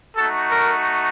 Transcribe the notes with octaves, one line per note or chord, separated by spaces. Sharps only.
A3 D#4 F#4 A4
A#4